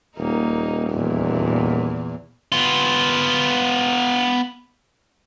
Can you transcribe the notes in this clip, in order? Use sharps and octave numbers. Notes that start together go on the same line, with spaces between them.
D#1 A#3 D#4
E2 A#2
B3 F4